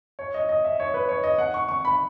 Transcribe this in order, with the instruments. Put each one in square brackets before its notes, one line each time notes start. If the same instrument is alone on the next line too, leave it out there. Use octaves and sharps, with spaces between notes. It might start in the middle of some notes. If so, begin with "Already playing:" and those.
[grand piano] C#5
D#5
D#5
E5
C#5
B4
C#5
D#5
F#5
C#6
C#6
B5